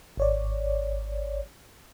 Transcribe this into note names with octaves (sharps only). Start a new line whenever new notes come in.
G#1 C#5 D5